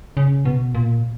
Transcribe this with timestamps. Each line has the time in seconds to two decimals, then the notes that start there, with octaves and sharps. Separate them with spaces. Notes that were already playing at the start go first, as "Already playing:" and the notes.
0.17 C#3
0.45 B2
0.75 A#2